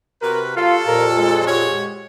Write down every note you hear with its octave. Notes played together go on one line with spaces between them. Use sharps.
C3 F#4 A#4 B4
F#3 F4 G4 A4 F5
F2 A#2 A#4
G#3
F#4 G4 C#5